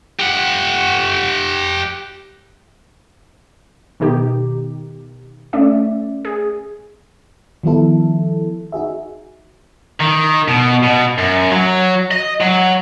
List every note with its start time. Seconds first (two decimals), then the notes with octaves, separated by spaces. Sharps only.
0.20 G4 F#5
4.00 B2 D#3 D#4 G4
5.53 A3 C#4 D5 E5
6.25 G#4
7.63 D#3 F3 G3 B3 E4 A4
8.72 D#4 F#4 G#4 E5
10.00 D#3
10.48 B2
10.83 B2
11.18 F#2
11.52 F#3
12.11 D#5
12.40 F#3